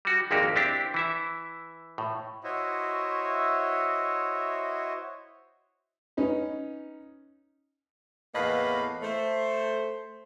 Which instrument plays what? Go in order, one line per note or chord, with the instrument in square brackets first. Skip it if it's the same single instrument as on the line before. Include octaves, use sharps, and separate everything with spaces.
[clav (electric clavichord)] G3 F#4
G#1 F2 G#3 A#3 F#4 G4
C4 D4 E4 G4
E3 E4 E5
A2
[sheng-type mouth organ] E4 F#4 C5 C#5 D#5 E5
[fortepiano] C#4 D#4 B4
[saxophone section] E2 A2 A#3 B4 D#5 F5
A3 C5